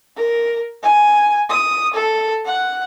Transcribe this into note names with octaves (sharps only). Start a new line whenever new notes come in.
A#4
G#5
D#6
A4
F#5